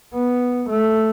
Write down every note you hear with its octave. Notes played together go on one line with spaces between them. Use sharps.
B3
A3